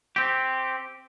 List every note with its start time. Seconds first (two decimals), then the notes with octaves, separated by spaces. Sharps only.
0.16 C4 G4